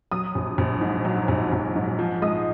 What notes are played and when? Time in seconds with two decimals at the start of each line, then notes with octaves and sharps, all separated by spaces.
0.11 F#3 D#6
0.35 A#1
0.58 A#1
0.81 G#2
1.05 F#3
1.28 A#1
1.52 A#1
1.76 G#2
1.99 F3
2.22 G#3 D#6